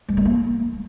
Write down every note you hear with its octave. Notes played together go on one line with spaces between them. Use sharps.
G#3
A3
A#3